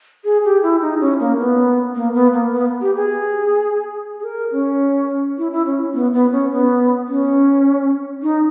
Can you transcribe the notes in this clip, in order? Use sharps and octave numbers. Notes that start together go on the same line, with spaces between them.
G#4
G4
E4
D#4
C#4
A#3
B3
A#3
B3
A#3
B3
G4
G#4
G#4
A#4
C#4
E4
E4
C#4
B3
B3
C#4
B3
C#4
D#4